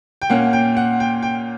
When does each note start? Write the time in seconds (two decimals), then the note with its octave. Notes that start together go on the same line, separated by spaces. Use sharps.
0.22 G5
0.30 A#2 A#3 C#4 F#5
0.53 G5
0.77 F#5
1.00 G5
1.23 G5